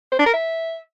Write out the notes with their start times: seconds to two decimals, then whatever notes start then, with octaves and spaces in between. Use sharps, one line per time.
0.12 C5
0.19 D4
0.26 A#4
0.33 E5